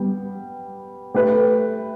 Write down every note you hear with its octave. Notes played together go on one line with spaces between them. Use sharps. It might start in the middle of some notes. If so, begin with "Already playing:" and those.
Already playing: G3 B3 G4
A3 G4 B4